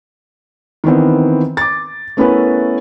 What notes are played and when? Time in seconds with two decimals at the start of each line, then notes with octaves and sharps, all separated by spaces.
0.84 D#3 E3 B3 C4
1.57 D6 A6
2.17 A3 B3 C#4 E4 A#4 B4